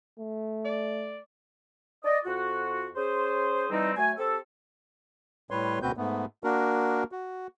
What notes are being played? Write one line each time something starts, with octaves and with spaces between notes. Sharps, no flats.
A3
D5
D5 D#5
F2 F4 F#4
C#4 G#4 C5
E3 G3 C4 D#4
F#3 A3 G#5
C4 G4 A4
A2 G3 B4 C#5 C6
D2 B2 C4 F#4 B4 G6
G#2 A3 B3
A#3 D4 F#4 A#4
F#4